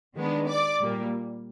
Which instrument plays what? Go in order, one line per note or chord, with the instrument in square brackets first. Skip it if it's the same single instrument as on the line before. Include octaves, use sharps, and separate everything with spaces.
[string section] D#3 G#3 B3 D4
D5 D6
A#2 G3 A#3